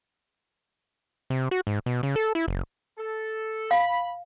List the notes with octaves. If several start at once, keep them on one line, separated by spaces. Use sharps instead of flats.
C3
F#4
G#2
B2
C#3
A4
E4
F#1
A4
F5 B5